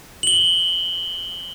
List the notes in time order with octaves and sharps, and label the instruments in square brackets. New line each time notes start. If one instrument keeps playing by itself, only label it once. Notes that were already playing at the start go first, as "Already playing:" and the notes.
[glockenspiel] F#7 G7